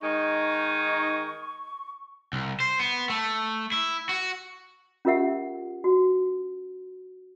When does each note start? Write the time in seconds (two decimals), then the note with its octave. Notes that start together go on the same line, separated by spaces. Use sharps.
0.01 D#3 G#3 D#4 C#6
2.33 C2
2.60 C5
2.80 B3
3.10 A3
3.72 E4
4.09 F#4
5.05 C#4 F4 G4 A#4 E5 F#5
5.84 F#4